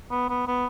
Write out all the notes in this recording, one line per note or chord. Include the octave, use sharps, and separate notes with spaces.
B3
B3
B3